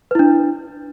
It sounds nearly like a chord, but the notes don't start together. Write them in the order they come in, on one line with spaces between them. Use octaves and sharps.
B4 E4 D4